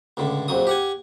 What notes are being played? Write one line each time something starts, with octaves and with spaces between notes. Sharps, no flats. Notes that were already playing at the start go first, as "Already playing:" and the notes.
C#2 A2 D3
A#1 F2 F#3 D#6
G4 F#5 G#5